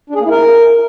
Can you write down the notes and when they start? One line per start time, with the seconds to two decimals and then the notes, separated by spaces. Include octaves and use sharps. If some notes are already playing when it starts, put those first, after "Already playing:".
0.10 D4
0.15 G#4
0.20 A#3
0.25 E4
0.31 A#4